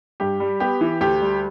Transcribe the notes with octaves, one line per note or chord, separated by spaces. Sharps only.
G2 G4
G3
B3 G4
E3
D2 G4
G3